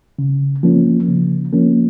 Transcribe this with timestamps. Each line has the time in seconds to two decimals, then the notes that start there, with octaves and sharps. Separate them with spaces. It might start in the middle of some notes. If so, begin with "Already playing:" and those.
0.19 C#3
0.63 F3 A#3 C#4
1.08 C#3
1.53 F3 A#3 C#4